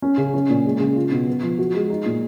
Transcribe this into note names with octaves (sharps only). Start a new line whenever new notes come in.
C#4
C#3
C#4
A#2
G#3
C#3
F4
B2
B3
F3
F#4
G#3
D#4
A#2